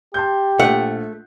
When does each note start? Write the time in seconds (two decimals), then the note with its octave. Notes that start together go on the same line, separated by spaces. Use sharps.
0.14 G4 A5 C6 G6
0.60 A#1 A3 F#5